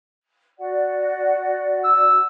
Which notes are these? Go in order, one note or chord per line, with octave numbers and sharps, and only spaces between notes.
F#4 D5 F#5
E6